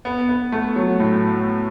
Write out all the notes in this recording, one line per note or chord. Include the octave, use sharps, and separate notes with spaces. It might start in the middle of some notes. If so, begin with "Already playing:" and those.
B3
B3
A3
F#3
A2